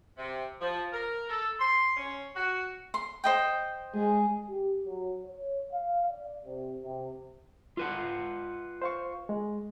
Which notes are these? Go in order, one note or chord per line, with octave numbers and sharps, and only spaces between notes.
C3
F3
A#4
A4
C6
C#4
F#4
C6
C5 D#5 G5
G#3 G#4
G4
F#3
C#5
F5
D5
C3
C3
F4 B4 F#5
C5 F5 C#6
G#3